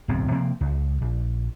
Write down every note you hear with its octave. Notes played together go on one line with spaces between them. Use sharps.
D1 B1 F#2 C4
C3 F3 A#3 C4
C#2
A#1